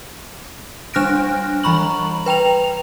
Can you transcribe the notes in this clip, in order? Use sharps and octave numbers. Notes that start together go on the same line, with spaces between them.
G3 D4 F6 F#6 A#6 D7
E3 G3 A#5 B5 C#6 F#7
B4 G5 A#5 F7